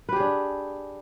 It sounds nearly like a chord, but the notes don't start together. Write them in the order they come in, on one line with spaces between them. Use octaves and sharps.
B4 G4 G#4 D4